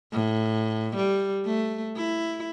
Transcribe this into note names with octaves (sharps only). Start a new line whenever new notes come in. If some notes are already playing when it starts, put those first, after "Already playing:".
A2
G3
A3
E4